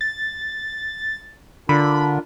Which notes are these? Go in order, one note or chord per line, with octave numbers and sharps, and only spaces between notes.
A6
D3 D4 F4 A#4 B5